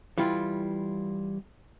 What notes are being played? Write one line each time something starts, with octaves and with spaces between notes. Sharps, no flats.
E3 G3 E4 F4